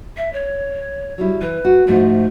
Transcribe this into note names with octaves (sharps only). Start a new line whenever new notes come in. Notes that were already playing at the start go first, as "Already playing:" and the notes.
E5
C#5
F#3 G3 E4
E3 B4
F#4
G#2 F3 A3 F#4